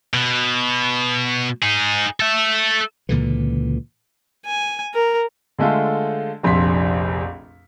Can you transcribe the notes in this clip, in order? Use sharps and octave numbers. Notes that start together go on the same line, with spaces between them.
B2
D#4 G#4
A4 E5
C#2 A#2 D3 E3
G#5
A#4
D3 G#3 A3 F4 A4
F1 A#1 F2 C6 B6